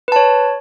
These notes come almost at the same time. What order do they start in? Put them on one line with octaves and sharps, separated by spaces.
B4 A5 C#5